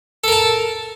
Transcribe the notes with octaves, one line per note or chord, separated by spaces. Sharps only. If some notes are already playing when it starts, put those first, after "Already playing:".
A4 A#4 A5